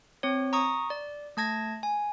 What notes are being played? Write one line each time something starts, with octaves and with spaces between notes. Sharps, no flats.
C4 C#5
A#5 C#6 D#6
D5
A3 A5 G#6 A#6
G#5